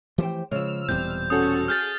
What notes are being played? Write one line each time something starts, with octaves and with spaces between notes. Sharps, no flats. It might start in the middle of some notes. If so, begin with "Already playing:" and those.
E3 F3 A3 G4 C5 G5
C#3 F3 G#3 E6 F6
E1 E2 A#2 G3 C4 G6
C#4 F#4 A4 D#6
G#4 F6 G6 A6